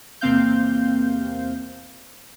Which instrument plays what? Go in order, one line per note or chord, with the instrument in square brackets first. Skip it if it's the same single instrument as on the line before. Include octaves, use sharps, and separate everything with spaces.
[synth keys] E2 C3 A#3 C4 F5 G6